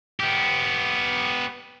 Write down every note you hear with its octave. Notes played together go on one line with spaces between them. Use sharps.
B3 G4